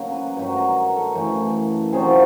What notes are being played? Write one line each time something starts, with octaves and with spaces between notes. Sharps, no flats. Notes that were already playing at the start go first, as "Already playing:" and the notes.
Already playing: C#3 F#3 A#3
B4
G2 D#3 F#3 B4
A#4
A4
F#2 C#3 E3 A3
C3 D#3 F#3 G#4
F4